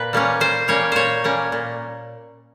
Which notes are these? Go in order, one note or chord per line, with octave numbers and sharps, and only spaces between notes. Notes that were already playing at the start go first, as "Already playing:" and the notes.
Already playing: A#2 B4
G3 A#3 C#4
A#2 C5
G3 A#3 C#4 C#5
A#2 C5 C#5
G3 A#3 C#4
A#2